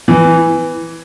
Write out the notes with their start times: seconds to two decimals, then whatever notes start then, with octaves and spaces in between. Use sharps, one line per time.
0.08 E3